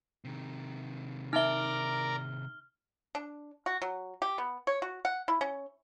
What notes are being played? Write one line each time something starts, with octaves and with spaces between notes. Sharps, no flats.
C3 D#3
D#4 A#4 D5 E5 A#5 F6 G7
D4
F#4
F#3
G4
B3
C#5
F#4
F#5
E4
C#4